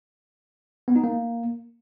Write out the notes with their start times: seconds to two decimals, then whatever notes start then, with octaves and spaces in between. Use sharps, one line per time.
0.88 B3
0.96 D#4
1.04 A#3